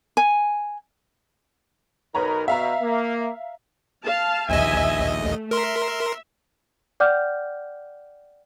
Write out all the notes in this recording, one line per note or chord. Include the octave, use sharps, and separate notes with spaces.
G#5
B1 D#4 A#4 B4 C#5 A#5
B2 E5 F5 A#5
A#3
F5 A5
A#1 D#2 D#5 E5 G#5
A3
A#4 E5 C6
D5 F#5 G5 D6 F6 G6